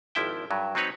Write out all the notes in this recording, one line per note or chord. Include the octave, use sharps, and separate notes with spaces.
G#1 F3 E4 E5 G5
G2 F#3
F#3 C4 D#4 B4 C#5